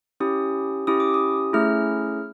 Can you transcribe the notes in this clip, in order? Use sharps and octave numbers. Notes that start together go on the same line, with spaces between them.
C#4 E4 G4 D#6
C#4 E4 G4 D#6
D6
D#6
A3 C#4 E4 G#4 F6